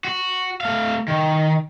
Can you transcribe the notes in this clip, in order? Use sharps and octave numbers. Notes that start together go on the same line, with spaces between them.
F#4
A3 F5
D#3